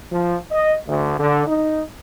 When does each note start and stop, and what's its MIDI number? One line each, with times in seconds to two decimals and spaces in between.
0.11 0.36 53
0.52 0.74 75
0.87 1.14 38
1.18 1.44 50
1.47 1.81 63